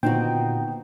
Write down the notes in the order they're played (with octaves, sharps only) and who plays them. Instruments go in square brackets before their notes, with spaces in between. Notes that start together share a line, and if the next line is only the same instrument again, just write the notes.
[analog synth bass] A#2 [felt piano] D3 D#3 B3 [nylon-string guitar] C4 D#4 F#4 [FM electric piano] G5